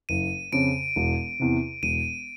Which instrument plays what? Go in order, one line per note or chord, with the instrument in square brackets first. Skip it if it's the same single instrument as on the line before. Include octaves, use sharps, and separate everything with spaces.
[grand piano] F#1 [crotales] D#7
[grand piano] F2 C#3 [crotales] D7
[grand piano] E1
E2 C3
[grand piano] E1 [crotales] D#7